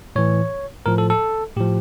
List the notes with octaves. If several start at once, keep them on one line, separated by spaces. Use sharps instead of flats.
A2 E3 C#5
A2 F3 A#4
A4
A4
A2 F3 G4